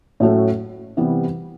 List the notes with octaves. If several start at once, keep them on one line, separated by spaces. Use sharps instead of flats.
A2 F#3 A3 C#4 F#4
C3 E3 G3 B3